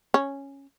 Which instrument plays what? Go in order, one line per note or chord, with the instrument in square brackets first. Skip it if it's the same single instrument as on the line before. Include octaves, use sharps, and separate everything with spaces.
[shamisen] C#4